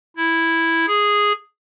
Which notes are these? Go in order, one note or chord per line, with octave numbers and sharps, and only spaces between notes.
E4
G#4